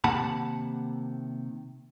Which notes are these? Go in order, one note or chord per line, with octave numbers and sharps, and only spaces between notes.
C3 D#3 A#3 F#5 A5 B5